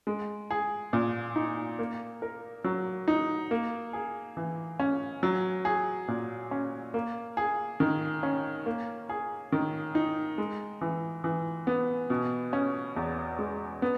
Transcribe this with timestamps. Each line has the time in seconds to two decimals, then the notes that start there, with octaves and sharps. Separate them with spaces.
0.07 G#3
0.51 G#4
0.93 A#2
1.36 D#4
1.79 A#3
2.22 A#4
2.64 F#3
3.08 D#4
3.51 A#3
3.93 G#4
4.37 E3
4.80 C#4
5.23 F#3
5.65 G#4
6.08 A#2
6.51 C#4
6.94 A#3
7.37 G#4
7.80 D#3
8.23 C#4
8.66 A#3
9.09 G#4
9.52 D#3
9.95 D#4
10.38 G#3
10.81 E3
11.24 E3
11.67 B3
12.10 B2
12.53 C#4
12.96 E2
13.39 G#3
13.82 B3